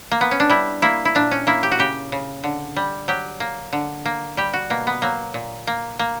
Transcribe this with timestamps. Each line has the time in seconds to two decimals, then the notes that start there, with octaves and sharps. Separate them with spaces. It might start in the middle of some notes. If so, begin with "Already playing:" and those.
0.11 A#3
0.21 B3
0.31 C#4
0.40 D4
0.49 G3 E4
0.82 A#3 E4
1.05 E4
1.15 A#2 D4
1.31 C#4
1.47 A#3 E4
1.63 G4
1.72 F#4
1.79 C#3 G4
2.12 C#3
2.44 D3
2.76 G3
3.08 F#3 G4
3.40 A#3
3.73 D3
4.05 A#3
4.37 G3 G4
4.53 F#4
4.70 B2 A#3
4.87 B3
5.02 F#3 A#3
5.34 A#2
5.67 A#3
5.99 A#3